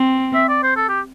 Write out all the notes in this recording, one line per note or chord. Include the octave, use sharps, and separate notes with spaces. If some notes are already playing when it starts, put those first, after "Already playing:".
Already playing: C4
E5
D5
C5
A4
G4